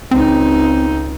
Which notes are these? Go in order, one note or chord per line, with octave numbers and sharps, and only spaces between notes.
C#2 C4 D#4